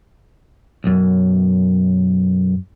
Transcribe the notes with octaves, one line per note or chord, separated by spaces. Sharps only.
B1 F#2